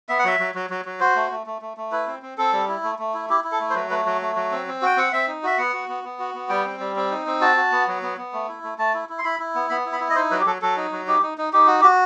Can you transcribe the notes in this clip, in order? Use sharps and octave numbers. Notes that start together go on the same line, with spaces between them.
B3 E5
F#5
F#3 E5
F#3
F#3
F#3
F#3
F#4 C5
A3
A3
A3
A3
A3
E4 B4
C4
C4
C4 A4
G3
E4
A3
A3
E4
E4 G4
E4
A4
A3
C5
F#3 B4
A3 B4
F#3
A3
F#3
C4
C4
F#4 G5
C4 F#5
C4 E5
D#4
F#4 E5
B3 F#5
F#4
B3
B3
F#4
B3
G3 G5
C4
G3
C4
D#4
C4
F#4 A5
F#4
B3
F#3
B3
B3
A3
E4
A3
A3 A5
E4
E4
C6
E4 B5
E4
B3
B3 B5
E4
B5
E4
D#5
D#4 C5
F#3 B4
G4
F#3 A4
F#3 A4
D#4
F#3
D#4 G4
D#4
D#4
D#4 G4
F#4
G4
F#4